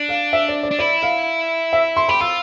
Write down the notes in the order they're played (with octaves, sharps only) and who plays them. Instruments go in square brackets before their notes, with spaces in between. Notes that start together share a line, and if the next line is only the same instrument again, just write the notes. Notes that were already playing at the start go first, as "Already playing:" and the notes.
Already playing: [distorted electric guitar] D4
[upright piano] F5
E5
D5
D5
[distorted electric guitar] D4
[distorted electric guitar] E4 [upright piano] D5
[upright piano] F5
E5
C6
[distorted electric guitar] G4 [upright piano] B5
[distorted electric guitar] F4 [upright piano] E6